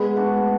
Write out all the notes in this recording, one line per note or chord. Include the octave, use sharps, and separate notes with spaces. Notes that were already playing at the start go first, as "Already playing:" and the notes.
Already playing: G#3 B3 G#4
A3 D4 F#4